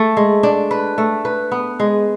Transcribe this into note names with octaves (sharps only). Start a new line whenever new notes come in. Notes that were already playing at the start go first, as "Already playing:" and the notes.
Already playing: A3
G#3
D4
B4
A3
B4
B3
G#3